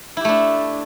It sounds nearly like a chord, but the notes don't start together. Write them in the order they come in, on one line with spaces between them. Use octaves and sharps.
E4 G4 A3 D4